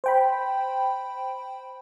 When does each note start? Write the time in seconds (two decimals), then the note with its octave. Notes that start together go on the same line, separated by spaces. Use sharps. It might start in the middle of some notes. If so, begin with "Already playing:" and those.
0.04 C5 G5 B5